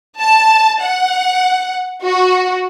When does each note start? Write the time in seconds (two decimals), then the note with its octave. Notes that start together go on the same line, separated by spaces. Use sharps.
0.20 A5
0.82 F#5
2.03 F#4